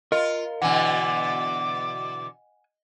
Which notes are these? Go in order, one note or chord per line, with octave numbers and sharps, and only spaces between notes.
F4 A#4 D#5
B2 D3 E3 F#5 G#5 D6